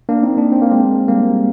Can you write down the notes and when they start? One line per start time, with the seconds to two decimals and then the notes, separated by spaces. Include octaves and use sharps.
0.09 A#3 D4
0.23 C4 D#4
0.37 A#3 D4
0.52 C4
0.62 A#3
0.71 G#3 C4
1.08 G3 A#3